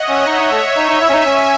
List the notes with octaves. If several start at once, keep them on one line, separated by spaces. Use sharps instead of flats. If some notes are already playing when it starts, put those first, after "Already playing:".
Already playing: C#5 D#5 E5 F#5
C#4
D#4
D#4
A3
D#4
D#4
E4 E5 G#5
C#4
D#4
C#4